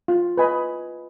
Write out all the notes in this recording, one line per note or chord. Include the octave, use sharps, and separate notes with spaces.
F4
B4 D#5 G#5 B5